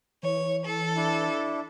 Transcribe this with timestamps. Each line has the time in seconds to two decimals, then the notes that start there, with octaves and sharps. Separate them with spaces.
0.23 E3 C#5
0.63 A4
0.96 D4 E4